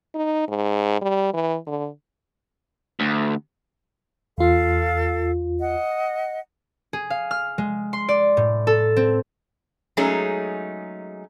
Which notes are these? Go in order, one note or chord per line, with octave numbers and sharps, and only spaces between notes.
D#4
G#2
G3
E3
D3
D2
E2 F4 A4 F5
D#5 F#5
G#4
F5
F6
G#3
C6
D5
A2
A4
C4
F#3 G#3 A3 C#4 D#4 G#4